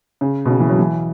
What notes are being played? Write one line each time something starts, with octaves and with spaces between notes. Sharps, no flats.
C#3
B2
C#3
E3
F#3
E3